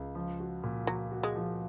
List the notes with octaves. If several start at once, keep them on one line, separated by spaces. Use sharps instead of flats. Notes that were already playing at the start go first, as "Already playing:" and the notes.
Already playing: C#2
F3
F#4
A#2
F3 F#3
F#4
G#3
F3